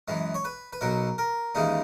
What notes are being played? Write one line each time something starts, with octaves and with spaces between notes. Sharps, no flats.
F#2 E3 G#3
C#5
B4
B4
B1 B2 F#3 A#4
A#4
D#2 C#3 E3 G#3 D#4